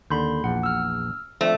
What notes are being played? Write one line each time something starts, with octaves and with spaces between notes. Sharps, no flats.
D#2 D3 B5 C6 G6
A#1 E2 F#5
E6 F6
F3 A3 C4 D4